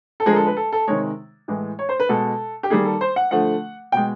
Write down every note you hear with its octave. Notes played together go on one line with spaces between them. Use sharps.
A4
D3 F3 G#3 G#4
A#4
A4
B4
A4
A4
C3 D#3 G#3 C#5
A2 E3 G#3
C#5
C5
B4
B2 G#3 A4
G4
D#3 G3 A#3 G#4
A4
C5
F#5
D3 F3 A3 F#5
B2 G#3 G5